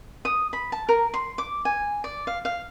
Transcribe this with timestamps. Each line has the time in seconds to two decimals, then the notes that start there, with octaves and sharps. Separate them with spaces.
0.25 D#6
0.53 B5
0.72 A5
0.89 A#4
1.14 C6
1.38 D6
1.65 G#5
2.04 D5
2.27 F5
2.45 F5